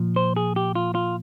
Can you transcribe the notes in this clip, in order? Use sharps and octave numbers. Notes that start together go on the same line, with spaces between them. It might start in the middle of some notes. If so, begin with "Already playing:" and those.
Already playing: A#2 F3
C5
G#4
G4
F4
F4